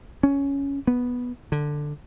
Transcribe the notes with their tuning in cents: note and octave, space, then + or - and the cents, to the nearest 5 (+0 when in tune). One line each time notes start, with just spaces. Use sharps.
C#4 +10
B3 -5
D3 +10